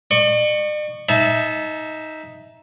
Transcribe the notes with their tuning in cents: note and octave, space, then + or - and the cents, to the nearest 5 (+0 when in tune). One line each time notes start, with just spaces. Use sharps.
D5 +45 C#6 +0
D#4 +10 E5 +0 A5 -30